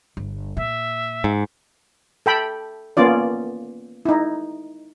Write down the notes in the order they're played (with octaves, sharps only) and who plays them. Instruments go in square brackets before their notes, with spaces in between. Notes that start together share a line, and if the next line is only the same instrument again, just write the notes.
[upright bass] G1
[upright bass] A#2 [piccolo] E5
[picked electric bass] G#2
[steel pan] A4 G5 B5
A#3 B3 C#4 F4 D5
D#4 E4